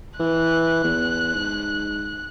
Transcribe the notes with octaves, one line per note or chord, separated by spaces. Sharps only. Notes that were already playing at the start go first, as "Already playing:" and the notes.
E3 F#6
E2
G#2